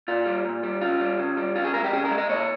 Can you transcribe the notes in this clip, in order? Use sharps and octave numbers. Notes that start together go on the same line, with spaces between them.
A#2 F4
G3
A#2
G3
C#3 F4
G3
C#3
G3
C#3 F4
G#4
G#3 A#4
G4
C#3 G#4
A#4
G#3
D#5
A#2 C#5